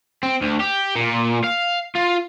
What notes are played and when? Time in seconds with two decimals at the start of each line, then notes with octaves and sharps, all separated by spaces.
0.23 C4
0.42 D2
0.60 G4
0.96 A#2
1.44 F5
1.95 F4